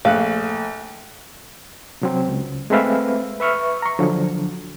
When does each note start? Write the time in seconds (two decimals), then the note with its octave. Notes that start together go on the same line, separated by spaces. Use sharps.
0.05 A#1 A3 F5 F#6
2.02 C3 F#3 C4
2.28 C#2
2.70 G#3 A3 C4 B4 E5 F5
3.40 B4 E5 C#6 F6
3.82 A#5 C#6
3.99 D3 F3 F#3